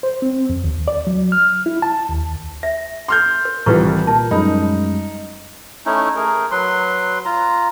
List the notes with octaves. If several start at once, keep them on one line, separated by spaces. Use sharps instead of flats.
C5
C4
F2
D#2
D5
F#3
F6
E4
A5
D#2
E5 A#6
C6 F6 G6
A#4
C2 D#3 E3 G3 F4 B4 C#6
A#2 A#4 A5
F#2 G3 G#3 D#4 B5
A3 C#4 D#4 E4
A3 G#4 A#4
F#3 B4 C6
F4 A#5